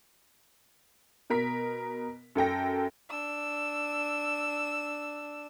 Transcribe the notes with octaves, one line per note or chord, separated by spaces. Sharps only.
B2 A#4 B6
F#2 A4 G5 A#6
D4 E6